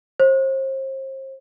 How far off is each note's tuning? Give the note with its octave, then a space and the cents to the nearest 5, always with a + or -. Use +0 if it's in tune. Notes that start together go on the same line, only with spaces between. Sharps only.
C5 +35